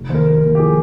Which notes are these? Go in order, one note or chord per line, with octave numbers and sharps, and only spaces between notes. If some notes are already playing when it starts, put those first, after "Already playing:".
Already playing: F1
D#2 C5
A#4
D#2
A#4
D#2
G4
F3 G#4